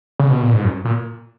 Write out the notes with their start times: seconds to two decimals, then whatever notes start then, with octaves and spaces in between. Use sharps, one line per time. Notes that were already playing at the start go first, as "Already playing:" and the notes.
0.19 C#3
0.30 B2
0.42 A#2
0.53 G#2
0.64 F#2
0.85 A#2